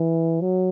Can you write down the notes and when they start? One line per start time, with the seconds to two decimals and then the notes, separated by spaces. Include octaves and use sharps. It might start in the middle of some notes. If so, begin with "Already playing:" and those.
Already playing: E3
0.41 F#3